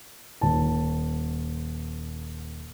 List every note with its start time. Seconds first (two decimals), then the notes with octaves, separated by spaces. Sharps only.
0.41 D#1 A5